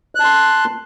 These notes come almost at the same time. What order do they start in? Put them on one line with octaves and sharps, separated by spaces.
F#6 A5 C6